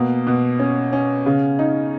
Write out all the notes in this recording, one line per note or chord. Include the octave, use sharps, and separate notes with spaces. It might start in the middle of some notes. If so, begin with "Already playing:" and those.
Already playing: B2 A#3
B2
C#4
C#4
C#3
D#4